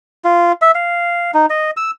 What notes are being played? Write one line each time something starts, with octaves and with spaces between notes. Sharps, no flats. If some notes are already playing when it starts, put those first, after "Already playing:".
F4
E5
F5
D#4
D#5
E6